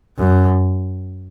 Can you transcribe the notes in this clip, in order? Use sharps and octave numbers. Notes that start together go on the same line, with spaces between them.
F#2